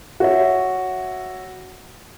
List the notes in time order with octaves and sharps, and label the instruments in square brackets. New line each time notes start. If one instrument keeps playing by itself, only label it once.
[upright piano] F#4 C#5 E5